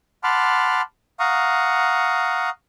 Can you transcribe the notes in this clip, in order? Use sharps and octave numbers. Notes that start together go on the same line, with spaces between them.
F#5 A5 B5 C6 D6 F6
F5 F#5 A#5 C#6 D#6